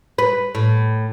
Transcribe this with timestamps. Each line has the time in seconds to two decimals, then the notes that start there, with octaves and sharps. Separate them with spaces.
0.18 B4
0.55 A2